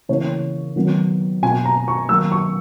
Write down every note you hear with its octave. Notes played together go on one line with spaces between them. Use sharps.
C#3 E3 A#3 C#5
D#3 F#3 B3
B2 A#3 G#5
A#5
C#6
D#3 F#3 A#3 E6
C#6